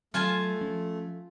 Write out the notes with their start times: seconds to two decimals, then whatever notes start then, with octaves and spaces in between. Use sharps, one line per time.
0.14 F#3 A3 F4 G#5 A5
0.61 F3 C#4